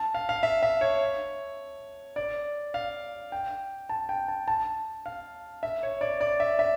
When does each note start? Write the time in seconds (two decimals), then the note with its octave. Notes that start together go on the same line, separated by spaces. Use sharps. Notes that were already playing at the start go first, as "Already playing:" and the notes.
Already playing: A5
0.14 F5
0.29 F5
0.43 E5
0.63 E5
0.81 C#5
2.16 D5
2.74 F5
3.32 G5
3.89 A5
4.09 G5
4.28 A5
4.48 A5
5.06 F5
5.63 E5
5.83 C#5
6.01 D5
6.21 D5
6.40 E5
6.59 E5